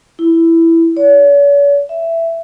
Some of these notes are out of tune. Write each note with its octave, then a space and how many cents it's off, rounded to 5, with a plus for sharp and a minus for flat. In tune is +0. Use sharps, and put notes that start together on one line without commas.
E4 +5
C#5 +45
E5 +10